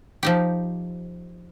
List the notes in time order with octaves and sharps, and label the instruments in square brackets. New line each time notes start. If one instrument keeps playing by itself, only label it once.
[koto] F3 D#4 G4